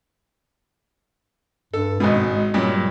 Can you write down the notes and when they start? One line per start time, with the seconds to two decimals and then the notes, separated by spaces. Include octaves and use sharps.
1.73 G2 A4
2.00 G#1 B2 G#3
2.54 G2 A#2 F#3